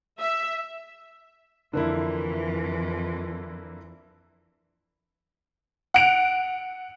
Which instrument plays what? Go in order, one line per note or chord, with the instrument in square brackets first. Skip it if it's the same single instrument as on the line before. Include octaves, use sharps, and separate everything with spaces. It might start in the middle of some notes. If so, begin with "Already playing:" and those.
[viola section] E5
[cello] F2 E3 [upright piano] D3 A#3 E4
[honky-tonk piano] F#5 D7 F7